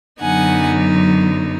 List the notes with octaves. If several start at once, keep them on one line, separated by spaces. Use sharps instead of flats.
F#2 D3 F#3 B3 D#4 F#5 G#5